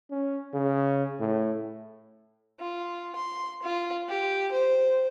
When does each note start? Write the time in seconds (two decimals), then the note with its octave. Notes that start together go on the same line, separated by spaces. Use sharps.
0.11 C#4
0.54 C#3
1.20 A2
2.60 F4
3.16 C6
3.63 F4
4.08 G4
4.52 C5